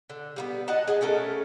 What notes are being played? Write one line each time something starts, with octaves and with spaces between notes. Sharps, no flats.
D3
G3 A#3 B3
F#4 D#5 F#5 A5
G#4 A4 D#5
A3 C#4 A4 A#4